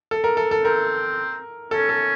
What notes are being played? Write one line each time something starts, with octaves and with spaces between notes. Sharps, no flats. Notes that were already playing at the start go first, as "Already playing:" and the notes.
A4
A#4
A4
A4
C4 A#4
C#4 A4
A4